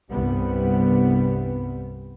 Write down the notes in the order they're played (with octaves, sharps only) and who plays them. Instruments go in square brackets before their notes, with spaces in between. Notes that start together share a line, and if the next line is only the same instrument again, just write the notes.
[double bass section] C2 G2 C3 G3 B3